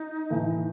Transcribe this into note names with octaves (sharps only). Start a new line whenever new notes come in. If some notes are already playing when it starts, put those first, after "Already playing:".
Already playing: D#4
A2 E3 A3